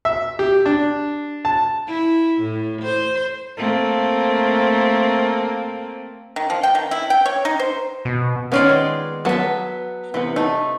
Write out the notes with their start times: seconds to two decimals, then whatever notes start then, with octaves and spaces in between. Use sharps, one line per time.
0.05 E5
0.39 G4
0.66 D4
1.45 A5
1.88 E4
2.41 A2
2.82 C5
3.57 A3 A#3 C4
6.36 D#3
6.50 F3
6.63 G5
6.75 D#3
6.91 E4
7.10 G5
7.26 C#5
7.45 D#4
7.59 C5
8.05 B2
8.52 D#3 B3 C#4 F4 D5
8.69 G#3
9.25 F#3 B3 E5 A5
10.14 C3 E3 B3
10.36 A3 D#4